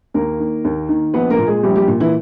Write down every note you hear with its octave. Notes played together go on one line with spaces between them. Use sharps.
D#2 A#3 A#4
D#3
D#2
D#3
A#1 B3 B4
A#3 A#4
A#2
G#3 G#4
A#1 G3 G4
G3 G4
A#2
E3 E4